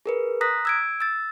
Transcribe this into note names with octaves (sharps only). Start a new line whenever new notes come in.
G#4 A#4 B4
A#5 D#6 F#6 A#6 B6
E6 G#6 D7
E6 A6